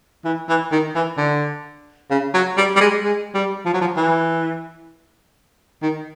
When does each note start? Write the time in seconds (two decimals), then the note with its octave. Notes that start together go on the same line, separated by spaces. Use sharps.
0.25 E3
0.48 E3
0.72 D#3
0.95 E3
1.17 D3
2.10 C#3
2.34 F#3
2.57 G3
2.76 G3
2.81 G#3
3.04 G#3
3.34 G3
3.66 F3
3.74 F#3
3.81 F3
3.97 E3
5.82 D#3